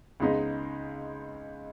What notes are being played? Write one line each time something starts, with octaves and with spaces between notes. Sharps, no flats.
C#2 C#3 G#3 B3 D#4